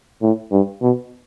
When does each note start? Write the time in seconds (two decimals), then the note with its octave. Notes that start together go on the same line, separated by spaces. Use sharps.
0.22 A2
0.52 G2
0.82 B2